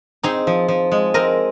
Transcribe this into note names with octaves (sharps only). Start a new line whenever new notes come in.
C4 D#4 G#4
F3
F3
G#3
C4 A#4 D#5